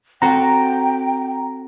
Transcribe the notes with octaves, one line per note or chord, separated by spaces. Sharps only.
C4 F#4 A4 G5 A#5